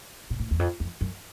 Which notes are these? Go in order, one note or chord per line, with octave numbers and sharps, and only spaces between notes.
A#2
A2
E2
F2
F2
F#2